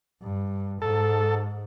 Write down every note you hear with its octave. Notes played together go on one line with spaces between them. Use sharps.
G2
G#2 A4